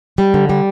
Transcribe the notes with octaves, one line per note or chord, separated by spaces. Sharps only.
G3
D3
G3